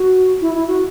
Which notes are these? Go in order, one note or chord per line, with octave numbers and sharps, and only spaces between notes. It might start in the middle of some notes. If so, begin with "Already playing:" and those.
Already playing: F#4
E4
E4
F#4